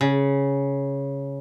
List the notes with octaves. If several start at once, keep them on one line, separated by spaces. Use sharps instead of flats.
C#3